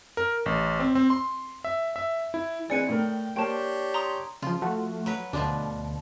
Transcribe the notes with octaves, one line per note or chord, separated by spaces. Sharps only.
A#4
A1
C4
C4
C6
E5
E5
E4
E3 G#3 C4 D5 G#5 C#7 D#7
A2 A#4 G5
A#3 D4 G4 C5 C#5 G5 A5
A#5 C6 D#6
C#3 F3 F4
F3 A3 F#4
F#3 B4
D2 B2 F3 D4